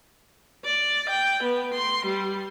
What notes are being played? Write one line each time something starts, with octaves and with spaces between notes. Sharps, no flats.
D5
G5
B3
C6
G3